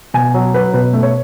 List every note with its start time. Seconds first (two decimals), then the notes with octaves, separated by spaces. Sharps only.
0.14 B2 G#5
0.34 F#3
0.54 F#3 B4
0.73 B2 B4
0.93 A3
1.03 C#5